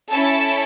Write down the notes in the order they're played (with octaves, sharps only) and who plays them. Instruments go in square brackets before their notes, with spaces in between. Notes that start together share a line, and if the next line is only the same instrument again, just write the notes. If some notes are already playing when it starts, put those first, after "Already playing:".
[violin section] C#4 E4 A4 A5